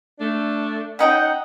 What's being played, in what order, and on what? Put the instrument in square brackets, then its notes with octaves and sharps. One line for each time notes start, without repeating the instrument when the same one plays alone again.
[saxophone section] A3 D4
[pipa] C#4 D#4 G5 [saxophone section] F#5